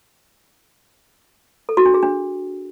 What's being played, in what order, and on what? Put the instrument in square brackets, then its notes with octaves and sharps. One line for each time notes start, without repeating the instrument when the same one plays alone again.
[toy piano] A4
F#4
D4
G#4
D4